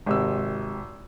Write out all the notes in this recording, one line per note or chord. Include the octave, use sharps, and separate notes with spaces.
G#1 C3 E6